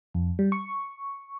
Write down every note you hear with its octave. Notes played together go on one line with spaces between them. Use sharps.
F2
G3
C#6